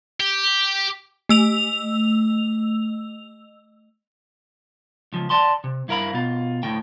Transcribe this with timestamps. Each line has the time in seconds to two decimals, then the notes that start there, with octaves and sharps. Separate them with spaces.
0.20 G4
1.29 A3 E6 F7
5.13 C#2 F3
5.30 D5 A5 C6
5.64 C3
5.88 G2 E4 A#4 F5 B5
6.14 B2 F4
6.63 D2 A2 G5